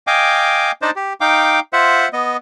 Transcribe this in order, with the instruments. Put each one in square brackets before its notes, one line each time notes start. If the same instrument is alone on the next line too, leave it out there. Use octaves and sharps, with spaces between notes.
[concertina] D#5 F5 G5 G#5 D6
D4 D#4 C5 D5 D#5 A5
G4
D#4 F5 G5 D6
F4 C5 E5 F#5
B3 D#5